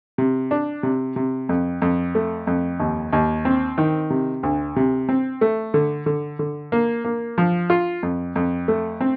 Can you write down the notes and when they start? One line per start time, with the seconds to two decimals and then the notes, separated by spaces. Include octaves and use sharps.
0.18 C3
0.51 D4
0.83 C3
1.16 C3
1.49 F2
1.82 F2
2.15 A3
2.47 F2
2.80 D#2
3.13 D#2
3.45 C4
3.78 D#3
4.10 C3
4.43 D2
4.76 C3
5.09 C4
5.41 A3
5.74 D3
6.06 D3
6.39 D3
6.72 A#3
7.05 A#3
7.38 F3
7.70 F4
8.03 F2
8.36 F2
8.68 A3
9.01 C4